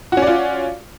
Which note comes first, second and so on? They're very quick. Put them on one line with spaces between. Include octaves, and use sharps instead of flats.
F#4 C#4 D5 F4